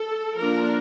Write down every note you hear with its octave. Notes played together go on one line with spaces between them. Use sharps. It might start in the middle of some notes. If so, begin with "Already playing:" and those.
Already playing: A4
F3 A#3 D4 F4 A#4